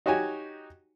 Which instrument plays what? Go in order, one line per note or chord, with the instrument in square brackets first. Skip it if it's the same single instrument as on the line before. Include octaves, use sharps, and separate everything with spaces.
[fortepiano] D#4 F#4 G4 C#5 G#5